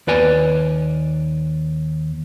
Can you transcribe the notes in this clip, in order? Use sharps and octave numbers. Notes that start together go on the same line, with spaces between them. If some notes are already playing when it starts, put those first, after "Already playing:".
D#2 B4 D5 G#5